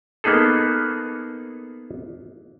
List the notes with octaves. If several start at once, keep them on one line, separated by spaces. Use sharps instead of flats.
A#3 B3 D#4 G#4 A4